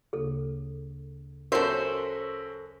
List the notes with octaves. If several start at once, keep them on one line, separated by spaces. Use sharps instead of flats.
D2 C#3 A#3 G#4 A4
F#2 F#4 A4 A#4 C5 C#5 E5